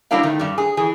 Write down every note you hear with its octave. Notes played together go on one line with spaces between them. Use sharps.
F#3 G3 A#3 D4 E4 F5
D#3 A3
G2 G3
G#4
E3 G#4